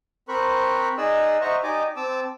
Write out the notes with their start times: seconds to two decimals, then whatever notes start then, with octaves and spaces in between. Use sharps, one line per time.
0.29 C4 A#4 C5 B5 C#6 F#6
0.98 D#4 G#4 D5 D#5 E6 F#6
1.41 C5 D#5 E5 F#5 A#5 C#6
1.63 D#4 G4 D5 D#5 G#5 D6
1.96 C4 A5 D6 E6